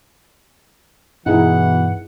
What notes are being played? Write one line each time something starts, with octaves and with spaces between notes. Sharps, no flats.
G2 B2 E3 D#4 E4 G#4 F#5